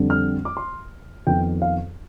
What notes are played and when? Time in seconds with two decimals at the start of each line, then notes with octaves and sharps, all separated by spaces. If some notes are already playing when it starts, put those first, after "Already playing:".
Already playing: F2 D3 G3 C4
0.10 F6
0.45 D6
0.57 C6
1.27 F2 D#3 B3 D#4 G5
1.62 F5